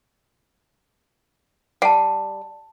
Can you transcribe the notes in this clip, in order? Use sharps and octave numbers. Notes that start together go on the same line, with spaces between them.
G3 F#5 A5